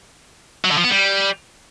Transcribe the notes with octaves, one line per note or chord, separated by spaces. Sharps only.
F#3
D3
F3
B3
G3